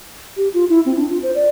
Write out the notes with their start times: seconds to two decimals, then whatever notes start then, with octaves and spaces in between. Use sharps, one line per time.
0.37 G4
0.54 F4
0.69 E4
0.86 C4
0.97 D4
1.10 F4
1.23 C5
1.35 D5